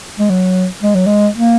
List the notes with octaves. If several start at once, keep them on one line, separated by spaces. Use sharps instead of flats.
G#3
F#3
G#3
F#3
G#3
A#3